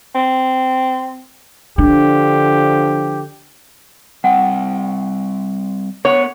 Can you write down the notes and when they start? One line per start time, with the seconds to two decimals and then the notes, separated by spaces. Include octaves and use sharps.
0.15 C4
1.78 D3 F3 D4 G4
4.24 G3 C4 F#5 G5
6.05 B3 A#4 C#5 F#5